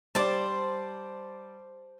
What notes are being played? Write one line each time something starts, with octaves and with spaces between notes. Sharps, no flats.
G3 C5 D5 A5 D6